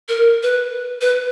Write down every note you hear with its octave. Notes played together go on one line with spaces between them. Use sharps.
A#4
B4
B4